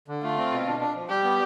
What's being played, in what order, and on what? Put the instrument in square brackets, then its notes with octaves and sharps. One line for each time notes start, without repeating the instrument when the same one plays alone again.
[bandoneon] D3
[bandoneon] A3 [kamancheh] F4
[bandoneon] C4
B2
D4
D4
F3
[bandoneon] G3 [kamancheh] G4
[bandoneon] B3